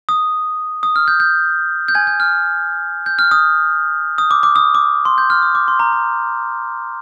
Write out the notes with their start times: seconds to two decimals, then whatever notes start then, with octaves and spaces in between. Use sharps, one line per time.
0.09 D#6
0.83 D#6
0.96 F6
1.08 G6
1.20 G6
1.88 G6
1.95 G#5 G#6
2.07 G6
2.20 F6
3.06 G6
3.19 F6
3.31 D#6
4.18 D#6
4.31 D6
4.43 D6
4.56 D#6
4.75 D6
5.05 C6
5.18 G6
5.30 F6
5.42 D#6
5.55 D6
5.68 C6
5.80 A#5
5.92 A#5